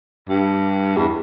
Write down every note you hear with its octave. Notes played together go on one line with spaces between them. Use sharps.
G2
E2